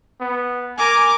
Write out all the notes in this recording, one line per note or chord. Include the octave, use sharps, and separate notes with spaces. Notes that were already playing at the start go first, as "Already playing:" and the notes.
B3
A#4 G#5 D6